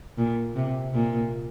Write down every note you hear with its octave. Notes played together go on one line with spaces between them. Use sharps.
A#2
C3
A#2